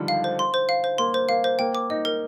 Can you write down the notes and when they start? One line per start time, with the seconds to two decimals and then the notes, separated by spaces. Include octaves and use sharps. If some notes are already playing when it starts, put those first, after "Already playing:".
Already playing: D3 D#3 F3 G3
0.08 F5
0.24 C5
0.39 C6
0.54 C5
0.69 F5
0.84 C5
0.98 A#3 C6
1.14 C5
1.29 A#3 F5
1.44 C5
1.59 A#3 G5
1.75 D6
1.90 D#4 D#5
2.05 A#4